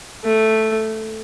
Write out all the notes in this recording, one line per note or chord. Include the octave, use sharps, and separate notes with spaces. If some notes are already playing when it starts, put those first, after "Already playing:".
A3